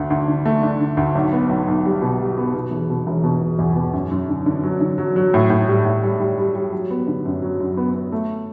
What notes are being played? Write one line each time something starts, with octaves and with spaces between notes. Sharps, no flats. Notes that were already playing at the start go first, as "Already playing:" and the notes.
Already playing: D2 D4
D2
D3
A3
D4
D3
D2
B1
B3
B1
B1
G3
B2
G3
B3
B2
E1
B2
E1
B2
E1
E2
B2
F#2
F#2
D3
D3
F#3
D3
F#3
F#3
A2
A2
G3
A2
G3
G3
G3
G3
F#3
B3
D3
F#2
F#3
F#2
B3
B3
A3